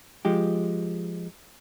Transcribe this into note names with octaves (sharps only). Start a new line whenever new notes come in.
F3 G#3 G4